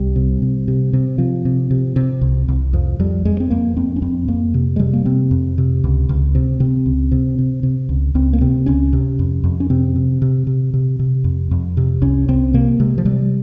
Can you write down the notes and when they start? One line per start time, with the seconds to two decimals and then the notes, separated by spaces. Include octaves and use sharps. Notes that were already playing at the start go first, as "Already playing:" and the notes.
Already playing: C2 G3
0.16 C3
0.42 C3
0.68 C3
0.93 C3
1.18 C3 F3
1.45 C3
1.71 C3
1.96 C3
2.21 C2
2.48 C2
2.73 F2 F3
3.00 F2 G3
3.25 F2 G#3
3.40 C4
3.50 F2 A#3
3.77 F2 C4
3.96 C#4
4.02 F2 C4
4.28 F2 A#3
4.54 C3
4.76 G#3
4.79 C3 G3
4.93 A#3
5.05 C3 C4
5.31 F2
5.58 C3
5.84 C#2
6.09 C#2
6.35 C3
6.60 C3 C4
6.86 C#2
7.12 C3
7.39 C3
7.63 C3
7.89 C#2
8.15 C#2 C4
8.33 A#3
8.41 C3 C4
8.66 C#2 C#4
8.93 C3
9.19 F2
9.44 F2
9.60 C#4
9.70 C3 C4
9.96 C3
10.22 C3
10.47 C3
10.74 C3
10.99 C3
11.24 F2
11.51 F2
11.77 C3
12.02 C2 C#4
12.28 C2 C4
12.54 C3 A#3
12.80 C3 G#3
12.98 F3
13.05 C3 G3